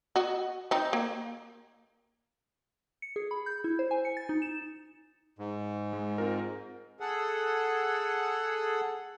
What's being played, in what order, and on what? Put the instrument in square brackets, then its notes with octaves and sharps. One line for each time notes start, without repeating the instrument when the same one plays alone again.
[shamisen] F#4 D#5
C4 D#4
A#3
[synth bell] C#7
G#4
B5
G6
E4
C5
G#5
C#7
A6
D#4
E7
[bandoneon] G#2
[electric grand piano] G#3
C4 F4 A#4
[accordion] G#4 A4 F#5